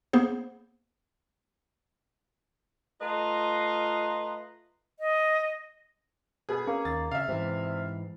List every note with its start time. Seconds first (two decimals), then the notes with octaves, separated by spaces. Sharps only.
0.13 A#3 B3 G#4 C5
3.01 A3 F4 B4 D#5 A#5 C6
4.99 D#5
6.49 B2 G#4
6.67 A#3 C#4
6.85 D#2 A6
7.11 C#3 E5 F5
7.28 G#2 C3 E3